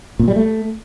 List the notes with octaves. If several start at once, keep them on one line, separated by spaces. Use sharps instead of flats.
A#2
G3
A3